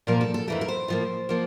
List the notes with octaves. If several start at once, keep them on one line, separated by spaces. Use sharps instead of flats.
A#2 F3 A#3 A#4
A4
A4
F2 E3 A3 A#4
A#4
C5
A2 F3 A#3
F3 A#3